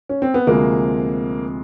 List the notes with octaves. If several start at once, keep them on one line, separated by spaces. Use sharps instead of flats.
C#4
C4
B3
D2 C3 F3 G#3 A#3